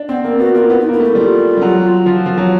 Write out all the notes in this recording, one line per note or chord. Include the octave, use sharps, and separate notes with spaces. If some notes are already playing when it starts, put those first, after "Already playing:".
Already playing: D4
B3 C4
A#3 C4
B3 F#4
A#3 F4
B3 E4
D#4
A#3 E4
A3
E4
G3 F4
G3
F#3
F3
F3
F#3